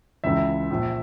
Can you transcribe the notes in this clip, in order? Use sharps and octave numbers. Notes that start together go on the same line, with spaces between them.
C#2 C#3 E3 E5
A#1 A#2